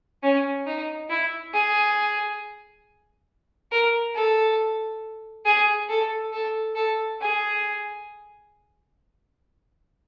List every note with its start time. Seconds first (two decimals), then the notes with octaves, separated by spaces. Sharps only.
0.23 C#4
0.66 D#4
1.09 E4
1.53 G#4
3.71 A#4
4.15 A4
5.45 G#4
5.89 A4
6.33 A4
6.76 A4
7.20 G#4